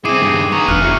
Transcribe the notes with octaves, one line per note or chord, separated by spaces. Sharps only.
C4 E4 G#4 D6 C7 D#7
G2 D#3
B3 A#5 C#6
F1 F2 D4 F6 F#6
E3 F#3